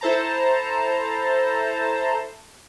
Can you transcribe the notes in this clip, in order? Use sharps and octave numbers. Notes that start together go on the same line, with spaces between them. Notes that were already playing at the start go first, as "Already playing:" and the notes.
E4 A4 C5 A5 A#5